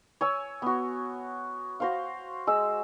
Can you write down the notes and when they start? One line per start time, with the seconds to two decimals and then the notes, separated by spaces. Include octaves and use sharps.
0.21 C#5 G#5 E6
0.62 B3 F#4
1.80 F#4 C5 F5
2.47 G#3 E6